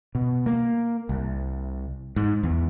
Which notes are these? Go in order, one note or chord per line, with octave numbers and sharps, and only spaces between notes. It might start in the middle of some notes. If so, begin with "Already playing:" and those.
B2
A#3
C2
G#2
E2